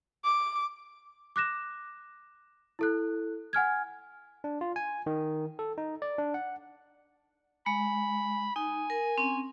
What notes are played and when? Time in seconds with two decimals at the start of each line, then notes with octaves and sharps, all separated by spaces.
0.25 D6
1.36 D6 F#6 A#6 E7
2.79 E4 A4 F#6
3.53 F#5 G#5 F6 G#6
4.44 D4
4.61 F4
4.76 G#5
5.06 D#3
5.59 A4
5.78 D#4
6.02 D5
6.18 D4
6.34 F#5
7.66 G#3 B5
8.56 D#4 G#5
8.90 A#4
9.18 C4 C#4